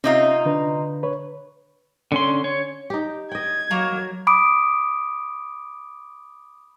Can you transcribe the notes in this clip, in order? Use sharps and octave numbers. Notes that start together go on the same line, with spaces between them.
C3 C#4 D#4 F4 E5
D3 D4 B4
B4 C#5
D3 C#4 C6
C#5
D#4 G4
D#5 G5 G#6
F#3 A#3 A#4 C#5
B5 D6 D#6 D7